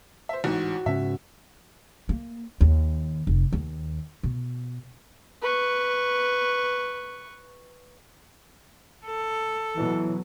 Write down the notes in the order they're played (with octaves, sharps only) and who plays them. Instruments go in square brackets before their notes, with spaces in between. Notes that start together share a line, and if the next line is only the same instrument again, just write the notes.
[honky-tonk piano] C5 E5
[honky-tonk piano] A1 G#2 [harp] F#4
[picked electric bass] G#2 C#3 C#4 [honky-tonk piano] E5
[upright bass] A#3
D#2
F1
D#2
B2
[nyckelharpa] B4 C#6
[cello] A4
[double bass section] B2 F#3 [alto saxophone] E3